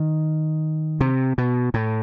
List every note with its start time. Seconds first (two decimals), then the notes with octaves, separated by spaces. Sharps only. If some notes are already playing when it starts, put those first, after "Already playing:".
Already playing: D#3
1.00 C3
1.38 B2
1.74 A2